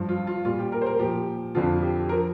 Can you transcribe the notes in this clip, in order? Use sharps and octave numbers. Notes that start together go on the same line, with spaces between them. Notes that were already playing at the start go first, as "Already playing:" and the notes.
Already playing: G2 F3
F4
F4
A#2 G3 F4
G4
A#4
C5
A#4
A#2 F3 G4
F2 D3 F3 F4
G4
F3 A#4